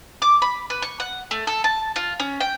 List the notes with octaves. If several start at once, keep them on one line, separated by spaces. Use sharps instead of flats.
D6
B5
B4
C#6
F#5
A3
A4
A5
F4
C#4
G5